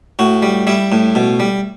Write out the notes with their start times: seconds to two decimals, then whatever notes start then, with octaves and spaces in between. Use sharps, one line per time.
0.19 A2 F#4
0.42 G3
0.67 G3 E4
0.92 A2
1.15 B2
1.40 G3